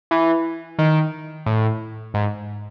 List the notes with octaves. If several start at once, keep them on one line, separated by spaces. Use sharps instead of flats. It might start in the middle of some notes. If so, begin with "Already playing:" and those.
E3
D#3
A2
G#2